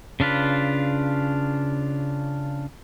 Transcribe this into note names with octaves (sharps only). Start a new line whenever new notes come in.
C#3 D4 F4 B4